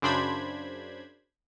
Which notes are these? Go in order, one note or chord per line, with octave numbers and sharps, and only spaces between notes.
F#2 C#3 D4 C5 B5 G#6